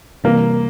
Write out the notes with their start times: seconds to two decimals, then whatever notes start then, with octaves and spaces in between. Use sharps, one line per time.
0.24 C3 E3 G3 A#3